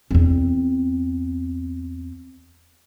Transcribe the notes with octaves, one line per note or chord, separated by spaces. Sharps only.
E2 C4